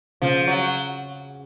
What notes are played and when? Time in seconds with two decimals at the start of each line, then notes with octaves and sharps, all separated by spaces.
0.22 C#3 F3
0.47 F#3